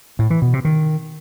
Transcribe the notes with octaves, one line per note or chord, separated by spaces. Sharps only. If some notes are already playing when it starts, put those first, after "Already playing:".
A2
E3
B2
C3
D#3